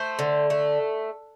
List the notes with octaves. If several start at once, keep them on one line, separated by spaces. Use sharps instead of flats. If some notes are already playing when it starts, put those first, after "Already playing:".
Already playing: A3 C5
D3
A3